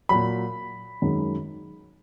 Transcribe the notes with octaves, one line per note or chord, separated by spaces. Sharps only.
A#2 F#3 B5
F#2 D#3 G#3